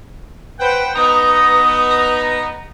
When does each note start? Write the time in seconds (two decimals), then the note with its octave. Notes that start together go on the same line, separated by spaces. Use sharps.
0.59 B4 C5 F#5 G5
0.95 B3 D#4 A#5 D#6
1.91 A#5